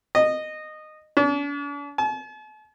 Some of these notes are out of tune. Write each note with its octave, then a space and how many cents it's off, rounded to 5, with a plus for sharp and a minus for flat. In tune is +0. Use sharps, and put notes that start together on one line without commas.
D#5 -15
D4 -45
A5 -45